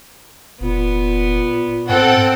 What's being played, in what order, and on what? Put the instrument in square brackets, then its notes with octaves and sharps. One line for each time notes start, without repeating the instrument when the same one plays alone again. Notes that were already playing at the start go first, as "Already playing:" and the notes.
[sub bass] F1 [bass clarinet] A#2 [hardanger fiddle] B3
[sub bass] G#2 [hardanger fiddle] C4 [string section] A4 F#5 G5